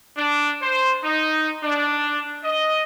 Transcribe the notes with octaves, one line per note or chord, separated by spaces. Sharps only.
D4
C5
D#4
D4
D#5